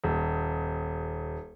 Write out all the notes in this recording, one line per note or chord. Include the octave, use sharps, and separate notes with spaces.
D#1